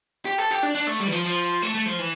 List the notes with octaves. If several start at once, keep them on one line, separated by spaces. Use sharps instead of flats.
G4
A4
G4
D4
D4
A3
G3
E3
F3
F3
A3
A3
F3
E3